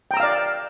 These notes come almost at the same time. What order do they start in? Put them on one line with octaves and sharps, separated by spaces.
G5 A#5 E6 F5 D5